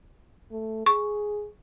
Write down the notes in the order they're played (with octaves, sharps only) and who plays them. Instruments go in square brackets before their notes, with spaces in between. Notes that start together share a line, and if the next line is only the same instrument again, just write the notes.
[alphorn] A3
[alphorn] G#4 [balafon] C#6